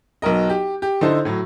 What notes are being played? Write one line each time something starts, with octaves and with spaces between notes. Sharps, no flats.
B1 F#3 A#4 D#5
G4
G4
D3 D#4 E4 A4 C5
A2 F#3